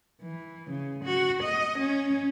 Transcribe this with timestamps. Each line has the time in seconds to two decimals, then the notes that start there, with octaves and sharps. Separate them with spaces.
0.22 E3
0.70 C#3
1.04 F#4
1.43 D#5
1.78 C#4